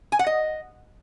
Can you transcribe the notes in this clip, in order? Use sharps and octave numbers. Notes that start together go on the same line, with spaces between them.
G#5
F#5
D#5